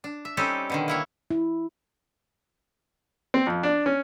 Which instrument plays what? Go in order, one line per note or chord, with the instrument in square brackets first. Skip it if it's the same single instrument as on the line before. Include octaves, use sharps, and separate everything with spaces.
[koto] D4
E5
G3 C4 C#4 D#4 G4 A4
B2 D3 D#3
A#3 E4 C#5
[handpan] E4
[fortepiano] C4
F2
D4
C#4